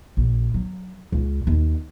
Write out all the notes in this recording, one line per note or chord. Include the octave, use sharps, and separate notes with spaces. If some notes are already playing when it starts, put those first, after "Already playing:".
A#1
F#3
C#2
D#2